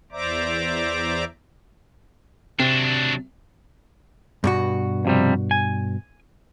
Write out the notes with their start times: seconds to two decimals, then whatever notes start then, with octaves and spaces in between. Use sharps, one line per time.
0.12 E2 C5 D5 E5 A#5 D6
2.60 C3 F#3 D4
4.44 G2 B2 F#4
5.05 F2 C3 G3
5.51 G#5